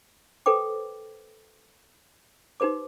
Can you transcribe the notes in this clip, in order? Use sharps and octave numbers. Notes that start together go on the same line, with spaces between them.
A4 B4 C5 G5 D6
D#4 G4 B4 C5 D6